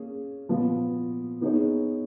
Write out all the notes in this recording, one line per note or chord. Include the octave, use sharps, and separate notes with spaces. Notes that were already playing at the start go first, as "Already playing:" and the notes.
Already playing: A#3 C#4 G#4
A#2 F3 B3
B3 D#4 G#4 C#5